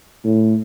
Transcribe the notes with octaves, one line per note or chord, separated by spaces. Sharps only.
A2